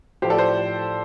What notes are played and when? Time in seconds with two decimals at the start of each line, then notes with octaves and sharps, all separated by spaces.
0.22 A2 F3 G4 C5
0.30 A4 D5
0.39 C5